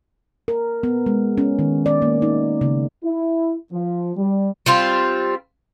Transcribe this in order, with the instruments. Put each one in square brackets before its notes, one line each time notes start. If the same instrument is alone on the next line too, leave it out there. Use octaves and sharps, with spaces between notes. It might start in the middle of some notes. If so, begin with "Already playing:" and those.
[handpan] A#4
B3
G#3
C#4
D#3
D5
A#3
D#4
C#3
[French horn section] E4
F3
G3
[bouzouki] G3 C4 F4